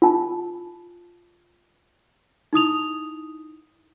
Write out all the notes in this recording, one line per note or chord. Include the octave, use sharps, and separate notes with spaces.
F4 A5
D#4 E4 D#6 F7